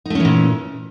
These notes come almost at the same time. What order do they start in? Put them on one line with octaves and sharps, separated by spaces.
D#4 A3 C#4 E3 A#2